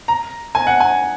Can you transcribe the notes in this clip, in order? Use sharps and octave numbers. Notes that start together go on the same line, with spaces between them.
A#5
G#5
F#5
G#5